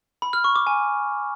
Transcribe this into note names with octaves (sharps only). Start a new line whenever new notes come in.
B5
F6
C#6
D6
G#5